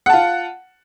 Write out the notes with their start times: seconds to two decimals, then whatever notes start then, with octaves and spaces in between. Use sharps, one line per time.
0.06 F#5
0.10 A5
0.13 F4